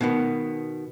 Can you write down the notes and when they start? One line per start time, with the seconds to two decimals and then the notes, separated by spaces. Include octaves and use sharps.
0.01 B2 D#3 B3